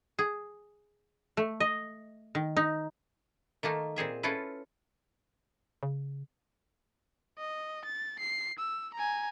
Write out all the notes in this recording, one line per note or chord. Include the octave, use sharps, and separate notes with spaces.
G#4
A3
D#5
D#3
D#4
D#3 A3 A#3 D#4
A#2 C4 G#4 E5
C#4 E4 F4 A4 B4
C#3
D#5
A6
C7
E6
G#5 A#5